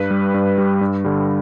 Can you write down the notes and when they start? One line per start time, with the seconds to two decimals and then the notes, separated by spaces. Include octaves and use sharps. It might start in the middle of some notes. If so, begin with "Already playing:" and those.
Already playing: G2 B4
0.11 G3
0.34 G2
0.58 G3
0.81 G2
1.05 D3 G3